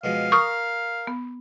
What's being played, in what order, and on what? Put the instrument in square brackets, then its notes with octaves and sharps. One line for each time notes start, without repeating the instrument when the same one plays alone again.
[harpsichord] B2 F3 G#3 [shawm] F5
[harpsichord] A#4 [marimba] C#6 D#6 F6
[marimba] B3